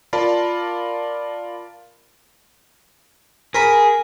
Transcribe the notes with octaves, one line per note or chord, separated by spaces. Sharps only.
F4 A#4 D5 F5 A5 B5
G#4 A#4 B5